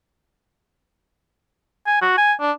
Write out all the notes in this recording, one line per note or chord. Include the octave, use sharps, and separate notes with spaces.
G#5
F#4
G#5
D4